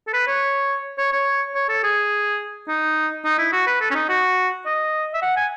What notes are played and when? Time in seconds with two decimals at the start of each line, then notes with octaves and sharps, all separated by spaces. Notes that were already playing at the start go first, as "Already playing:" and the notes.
0.07 A4
0.13 B4
0.27 C#5
0.98 C#5
1.13 C#5
1.55 C#5
1.69 A4
1.83 G#4
2.68 D#4
3.25 D#4
3.38 E4
3.52 F#4
3.67 B4
3.81 A4
3.91 C#4
3.95 D#4
4.09 F#4
4.66 D#5
5.14 E5
5.22 F#5
5.36 G#5